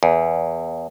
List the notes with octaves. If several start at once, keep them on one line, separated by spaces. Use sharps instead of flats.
E2